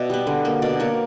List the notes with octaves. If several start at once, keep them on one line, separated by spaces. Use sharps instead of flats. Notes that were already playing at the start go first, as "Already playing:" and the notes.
Already playing: B2 D5 E5
G3 B3
D3
A#3
B2 D5
A#3 C#5